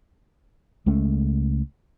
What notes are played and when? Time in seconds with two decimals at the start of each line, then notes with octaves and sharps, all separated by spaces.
0.86 C#2 G#3 A3 C#4